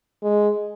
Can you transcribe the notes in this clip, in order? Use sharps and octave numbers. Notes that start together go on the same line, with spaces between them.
G#3